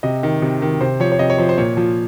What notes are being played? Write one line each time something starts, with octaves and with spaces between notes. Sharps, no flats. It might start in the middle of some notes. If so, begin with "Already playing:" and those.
C3 D#5
D#3
C3
D#3
C3 C5
F3 C#5
C#5
C3 D#5
C#5
F3 C5
C5
A#2 C#5
F3